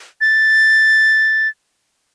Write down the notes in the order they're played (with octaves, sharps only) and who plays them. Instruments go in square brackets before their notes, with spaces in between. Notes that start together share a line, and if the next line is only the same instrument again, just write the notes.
[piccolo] A6